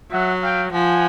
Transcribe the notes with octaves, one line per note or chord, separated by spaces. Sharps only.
F#3 E5 F#5
F5 G5
F3 F#5 G#5